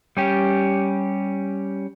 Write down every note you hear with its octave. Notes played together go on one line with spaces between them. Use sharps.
G3 C#4 G4